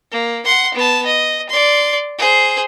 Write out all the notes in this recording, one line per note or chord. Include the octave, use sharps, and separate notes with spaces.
A#3
F#5 C6
B3 A5
D#5
D5 C6
G#4 C5